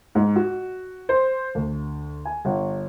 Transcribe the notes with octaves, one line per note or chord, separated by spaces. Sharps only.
G#2
F#4
C5
D2
G#5
G1